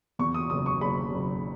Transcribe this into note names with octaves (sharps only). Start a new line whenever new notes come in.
E2 C#6
D#6
F#1 D#6
C#6
F#1 B5
F#1